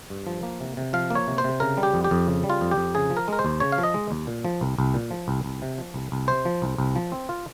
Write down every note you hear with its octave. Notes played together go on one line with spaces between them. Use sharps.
G2
F3
A#3
C3
C3
F3 F5
A#3 C#5
C3
C5
C3
C#3 A#4
G3
G4
F2
G4
F2
C#3
G3
F4
F2
G4
F2
C#3 G#4
F3
A#4
G#3 A#4
C5
D#2
C#3 C#5
F5
F3
D#5
G#3
D#2
A#2
F3
C2
C2
A#2
F3
C2
C2
C3
F3
C2
C2
C3 C5
F3
C2
C2
F3
C4
F4